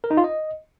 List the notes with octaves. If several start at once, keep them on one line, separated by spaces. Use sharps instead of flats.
A#4
D#4
F4
D#5